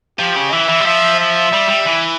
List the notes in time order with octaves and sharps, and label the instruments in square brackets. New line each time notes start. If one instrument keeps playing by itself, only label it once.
[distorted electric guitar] F3 [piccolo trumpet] G4
[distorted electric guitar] C#3
[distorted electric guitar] E3 [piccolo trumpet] E5
[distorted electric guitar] E3
G3
[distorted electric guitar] F3 [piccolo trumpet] E5
[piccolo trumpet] E5
[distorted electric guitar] G3
G3
E3